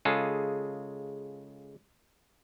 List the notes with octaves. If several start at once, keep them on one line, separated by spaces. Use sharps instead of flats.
C#3 G#3 F4 G#4 A4